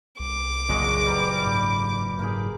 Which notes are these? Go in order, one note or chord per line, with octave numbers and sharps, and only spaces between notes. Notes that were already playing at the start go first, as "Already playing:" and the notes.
C2 D6
F#1 A#2 G#3 F#4
G3 B4 A#5
G#2
G#2 A#3 G4 G#4